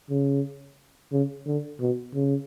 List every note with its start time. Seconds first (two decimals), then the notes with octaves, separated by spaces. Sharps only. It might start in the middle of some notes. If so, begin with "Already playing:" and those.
0.10 C#3
1.12 C#3
1.47 D3
1.80 B2
2.14 C#3